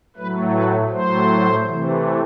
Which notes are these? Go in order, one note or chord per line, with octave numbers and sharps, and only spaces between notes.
A2 F#3 A3 B4
B4
A2 F#3 A3 C5
C3 E3 A3